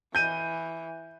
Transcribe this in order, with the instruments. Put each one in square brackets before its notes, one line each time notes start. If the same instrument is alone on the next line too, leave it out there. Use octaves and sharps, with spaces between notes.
[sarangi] E3 [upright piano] G6 D#7